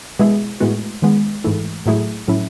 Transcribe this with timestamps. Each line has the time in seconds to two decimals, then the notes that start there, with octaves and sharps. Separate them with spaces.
0.19 B2 G#3 B3 E4 G#4
0.60 A2 G#3 B3 F#4
1.02 D#3 G#3 B3
1.44 G#2 E3 A3 E4
1.86 A2 F#3 A3 E4 G#4
2.28 A2 F#3 C#4 E4